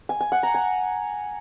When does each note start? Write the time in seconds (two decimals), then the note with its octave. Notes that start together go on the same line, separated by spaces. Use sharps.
0.09 G#5
0.21 G#5
0.32 F#5
0.43 A#5
0.54 G#5